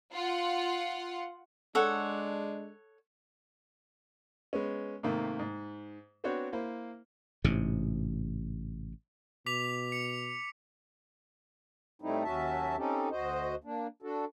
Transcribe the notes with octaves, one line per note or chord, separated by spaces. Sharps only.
F4 F#5
G#3 D4 A4 C#5 F#5
G#3 B3 C#4
G#2 C3 D#3 A3 A#3
G#2
B3 C4 D4 F#4 C5 C#5
A#3 E4 C5
A1 G#2 C3
B2 D6 B6 F7
C#7
A2 G3 A3 C4 D#4 E4
D#2 F#3 C#4 F#4 E5 A5
C4 C#4 D#4 G4 A4
D2 F#4 C5 D#5
A#3 D4
D4 F#4 A4